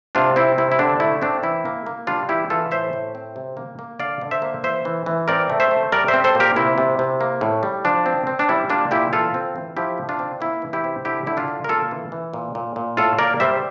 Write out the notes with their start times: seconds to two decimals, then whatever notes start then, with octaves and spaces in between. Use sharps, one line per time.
0.15 C3 D4 F4
0.36 C4 E4
0.58 C3 E4
0.72 E4
0.79 D3 D4
1.00 A3 E4
1.22 C4 D4
1.43 E3 E4
1.65 A#3
1.86 A#3
2.07 G3 D4 F4
2.29 E3 E4 G4
2.50 E3 F4 A4
2.71 A2 C5 E5
2.93 A2
3.15 C4
3.36 C3
3.57 A#3
3.79 A#3
3.99 D3 D5 F5
4.21 D3
4.31 C5 E5
4.42 A#3
4.63 E3 C5 E5
4.85 E3
5.06 E3
5.28 C4 A#4 D5
5.50 A3
5.60 C5 E5
5.71 A3
5.92 G3 A#4 D5
6.08 C5 E5
6.14 C4
6.24 A4 C5
6.35 A#2
6.40 G4 A#4
6.56 C3 E4
6.78 C3
6.99 C3
7.21 A#3
7.41 A2
7.63 G3
7.85 F3 D4
8.06 C4
8.27 C4
8.39 D4
8.49 G3 E4
8.70 A#3 D4 F4
8.91 A#2 E4 G4
9.13 E3 F4 A4
9.34 C4
9.56 E3
9.77 F3 E4 G4
9.98 A3
10.09 D4 F4
10.19 C4
10.41 A#3 E4
10.62 E3
10.73 E4 G4
10.84 C3
11.05 D3 E4 G4
11.27 D3 E4
11.37 D4 F4
11.48 D3
11.64 A#4
11.69 A#3 F4 A4
11.91 E3
12.12 E3
12.34 A#2
12.55 A#2
12.76 A#2
12.97 A2 F4 A4
13.19 A#3 A#4 D5
13.40 G3 C5 E5